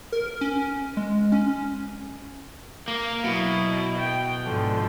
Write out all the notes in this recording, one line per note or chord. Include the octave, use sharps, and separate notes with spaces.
A#4
C#4
G#3
C#4
A#3
B2 F#3 E4
G5
G#2 D3 F3